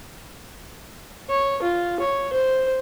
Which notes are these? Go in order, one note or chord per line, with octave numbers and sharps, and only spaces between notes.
C#5
F4
C#5
C5